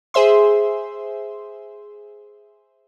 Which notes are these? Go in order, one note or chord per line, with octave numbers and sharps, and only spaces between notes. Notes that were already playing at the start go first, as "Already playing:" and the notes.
G#4 C5 E5 C6